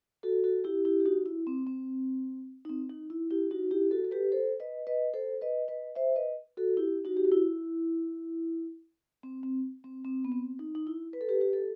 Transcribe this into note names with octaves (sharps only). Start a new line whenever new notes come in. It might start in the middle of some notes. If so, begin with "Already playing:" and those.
F#4 A4
F#4 A4
E4 G4
E4 G4
G4
D#4 F#4
E4
C4
C4
D#4
C4
D#4
E4
E4 G4
D#4 F#4
E4 G4
F#4 A4
A4
G4 B4
A4 C5
B4 D#5
B4 D#5
A4 C5
B4 D#5
B4 D#5
C5 E5
B4 D#5
F#4 A4
E4 G4
D#4 F#4
G4
F#4
E4
C4
C4
C4
C4
B3
C4
D#4
D#4
E4
B4
A4
G4 B4
G4 B4
A4